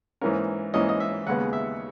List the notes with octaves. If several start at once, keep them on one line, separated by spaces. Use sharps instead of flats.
G#2 E3 A#3 C#4 A#4
G#2 E3 A#3 C#4 D#5
D#5
E5
D#2 C#3 G#3 B3 F#5
E5